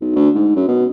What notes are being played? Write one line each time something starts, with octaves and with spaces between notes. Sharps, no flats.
B1
D2
G#2
F#2
B2